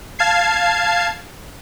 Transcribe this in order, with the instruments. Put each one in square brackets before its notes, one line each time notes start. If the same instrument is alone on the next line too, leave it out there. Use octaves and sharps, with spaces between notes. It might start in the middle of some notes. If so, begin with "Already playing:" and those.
[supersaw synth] F5 A5 G#6 C7